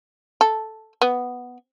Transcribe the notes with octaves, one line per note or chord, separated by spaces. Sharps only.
A4
B3